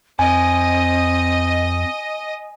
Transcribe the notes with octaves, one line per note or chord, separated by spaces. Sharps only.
F2 C4 D#5 G#5